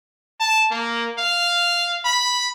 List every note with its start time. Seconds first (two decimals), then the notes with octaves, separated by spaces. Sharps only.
0.40 A5
0.71 A#3
1.18 F5
2.04 B5